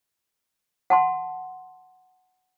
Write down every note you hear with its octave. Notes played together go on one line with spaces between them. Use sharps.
F#5 A5 C6